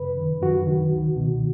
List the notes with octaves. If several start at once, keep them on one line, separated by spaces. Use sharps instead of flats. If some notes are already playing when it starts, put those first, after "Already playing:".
Already playing: F#2 C#3 B4
D#3
F#2 F#4
D#3
C#2
B2